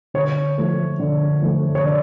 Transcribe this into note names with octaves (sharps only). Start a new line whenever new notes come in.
D3 C#5
F3 A3
D3
F3 A3
C#5
D3 D5